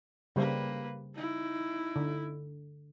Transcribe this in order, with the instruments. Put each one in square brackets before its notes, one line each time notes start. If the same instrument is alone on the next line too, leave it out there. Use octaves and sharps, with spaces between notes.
[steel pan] C#3 G3 C5 [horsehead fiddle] A#3 B4
[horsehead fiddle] D#4 E4
[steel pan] D3